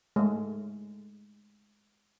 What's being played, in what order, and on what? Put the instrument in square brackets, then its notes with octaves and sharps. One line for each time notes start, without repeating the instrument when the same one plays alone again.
[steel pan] G#3 A3